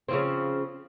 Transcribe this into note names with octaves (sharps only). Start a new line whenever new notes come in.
C#3 F3 C4